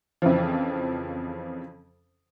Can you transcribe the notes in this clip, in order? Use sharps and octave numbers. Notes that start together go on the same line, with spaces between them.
F2 C#3 E3 F3